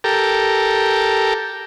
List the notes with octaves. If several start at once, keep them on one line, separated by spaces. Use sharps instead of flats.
G4 A4 A#4